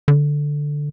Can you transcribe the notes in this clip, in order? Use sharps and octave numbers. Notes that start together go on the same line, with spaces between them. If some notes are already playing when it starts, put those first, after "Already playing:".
D3